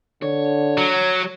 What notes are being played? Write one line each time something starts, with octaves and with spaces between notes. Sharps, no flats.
D3 C#5
F#3